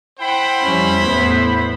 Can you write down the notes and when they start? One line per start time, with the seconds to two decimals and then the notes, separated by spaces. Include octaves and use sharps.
0.20 E4 C5 F#5 G5 B5
0.63 F2 G3 C#4
1.00 E2 A2 B3